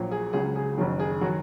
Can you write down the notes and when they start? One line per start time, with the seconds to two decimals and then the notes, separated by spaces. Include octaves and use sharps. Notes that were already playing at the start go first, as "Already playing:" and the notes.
Already playing: A#1 A#2 F#3
0.11 G#4
0.33 C#2 C#3 F#3 G#4
0.56 G#4
0.78 F#1 F#2 D#3 F#3
1.00 G#4
1.21 D#3 F#3 F#4